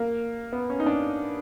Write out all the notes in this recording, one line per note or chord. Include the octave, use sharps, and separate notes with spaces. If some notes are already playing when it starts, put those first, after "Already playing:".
Already playing: A#3
B3
C#4
D#4
D4